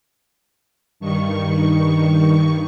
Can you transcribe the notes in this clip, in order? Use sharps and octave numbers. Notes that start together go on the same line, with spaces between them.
G2 D#3 C#6